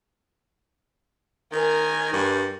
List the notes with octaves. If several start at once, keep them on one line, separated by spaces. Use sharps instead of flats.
D#3 A#4 G#5
G2